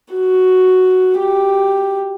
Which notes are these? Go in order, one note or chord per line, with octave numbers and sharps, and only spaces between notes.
F#4
G4